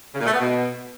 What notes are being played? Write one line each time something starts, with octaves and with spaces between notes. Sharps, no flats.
C#3
A#2
A3
B3
B2